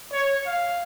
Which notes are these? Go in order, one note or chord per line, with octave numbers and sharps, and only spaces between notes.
C#5
F5